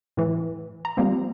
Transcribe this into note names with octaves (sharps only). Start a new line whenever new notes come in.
A2 E3
A#5
F3 G3 A#3 C4